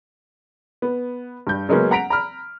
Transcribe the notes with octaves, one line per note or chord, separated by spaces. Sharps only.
B3
G2 G6
C#3 F#3 G#3 A#3 B3 C#4
F#5 A#5 B6 D7 F7
A#5 B5 F6